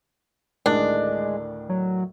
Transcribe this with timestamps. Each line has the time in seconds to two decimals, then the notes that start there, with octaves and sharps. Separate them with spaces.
0.66 D2 A2 D#3 G#3 D4
1.69 F#3